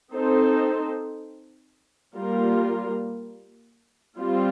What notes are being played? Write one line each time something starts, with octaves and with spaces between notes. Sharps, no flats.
C4 D#4 A4 C5
G3 A#3 F4 A#4
G3 C4 F4